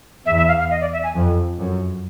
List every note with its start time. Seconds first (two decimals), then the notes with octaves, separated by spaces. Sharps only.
0.26 E2 E5
0.37 E5
0.48 F5
0.59 F5
0.71 D#5
0.81 D5
0.93 E5
1.03 G#5
1.14 F2
1.58 F#2